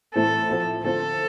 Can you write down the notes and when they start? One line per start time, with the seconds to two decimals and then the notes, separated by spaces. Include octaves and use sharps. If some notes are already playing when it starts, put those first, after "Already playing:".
0.15 A2 E3 A3 C4 A4
0.49 F3 C4 E4
0.84 D3 A3 C4 F4 A4